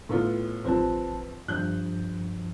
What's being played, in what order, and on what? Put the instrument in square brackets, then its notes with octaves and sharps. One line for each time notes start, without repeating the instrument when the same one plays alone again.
[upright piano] A2 B3 F4
[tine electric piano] A1 B4 A5 [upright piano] F3 C4
[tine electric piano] G2 F3 [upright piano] F#6 G6